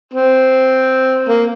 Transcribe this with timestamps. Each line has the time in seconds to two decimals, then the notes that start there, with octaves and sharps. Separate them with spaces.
0.14 C4
1.28 A#3